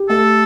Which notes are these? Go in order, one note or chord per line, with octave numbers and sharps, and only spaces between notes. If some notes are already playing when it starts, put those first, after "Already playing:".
Already playing: G4
A3 A4